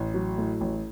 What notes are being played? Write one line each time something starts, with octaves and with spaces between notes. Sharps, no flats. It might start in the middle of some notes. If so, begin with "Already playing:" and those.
Already playing: A1
F#3
A2
A1